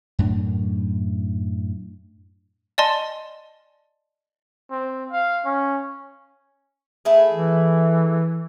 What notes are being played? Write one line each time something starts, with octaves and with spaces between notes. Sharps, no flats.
F#2 A2 D4
D5 D#5 G#5 A5 C6
C4
F5
C#4
A3 E4 G#4
E3